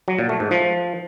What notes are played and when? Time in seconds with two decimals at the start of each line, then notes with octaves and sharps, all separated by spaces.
0.08 F#3
0.19 A#2
0.29 A3
0.40 G#2
0.51 F3